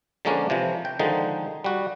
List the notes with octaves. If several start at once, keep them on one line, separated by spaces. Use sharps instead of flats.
D3 F3 G#3 A#3 C#4 D4
C3 E3 F3
G5
D3 D#3 F3 G#3 D#4
G3 F#4